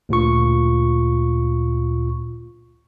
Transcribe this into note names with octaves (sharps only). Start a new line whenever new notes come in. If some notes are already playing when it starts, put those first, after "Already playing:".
D2 A#2 F4 C#6